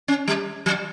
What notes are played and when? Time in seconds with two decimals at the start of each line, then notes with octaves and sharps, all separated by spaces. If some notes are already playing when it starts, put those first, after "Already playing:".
0.08 C#4
0.28 G3
0.66 F#3